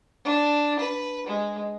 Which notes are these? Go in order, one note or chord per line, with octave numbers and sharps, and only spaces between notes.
D4
B4
G#3